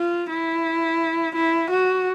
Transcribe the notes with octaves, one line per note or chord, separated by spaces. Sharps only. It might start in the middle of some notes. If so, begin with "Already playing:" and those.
Already playing: F4
E4
E4
F#4